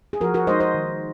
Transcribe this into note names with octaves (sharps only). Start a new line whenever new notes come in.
G#4
F3 F#4 A#4
F#4 A#4
G#3 D#4 C5 D#5
C5 D#5
D#3